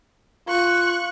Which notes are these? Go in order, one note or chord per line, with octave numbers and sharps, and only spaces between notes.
F4 C#6 F#6